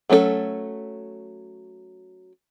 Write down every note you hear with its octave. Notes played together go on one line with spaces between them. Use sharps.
F#3 A3 C#4 F#4 A4